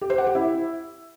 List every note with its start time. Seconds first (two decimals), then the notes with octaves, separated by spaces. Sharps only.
0.01 G4
0.10 C5
0.18 F#5
0.27 G4
0.35 E4